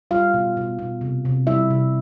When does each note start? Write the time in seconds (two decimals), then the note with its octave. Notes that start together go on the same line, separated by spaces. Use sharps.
0.11 G3 F4 F5
0.34 B2
0.57 B2
0.79 B2
1.01 C3
1.25 C3
1.47 G3 E4 E5
1.70 C3